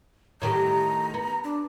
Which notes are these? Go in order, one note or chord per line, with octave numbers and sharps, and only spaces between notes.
A2 D#3 G4 A#5
B3
D4